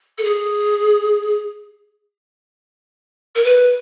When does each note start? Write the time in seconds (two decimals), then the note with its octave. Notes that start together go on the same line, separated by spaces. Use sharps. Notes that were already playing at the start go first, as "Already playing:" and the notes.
0.18 A4
0.24 G#4
3.35 A#4
3.44 B4